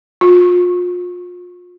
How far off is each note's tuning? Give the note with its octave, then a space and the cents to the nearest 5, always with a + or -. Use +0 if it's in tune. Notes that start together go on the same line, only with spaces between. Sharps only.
F4 +35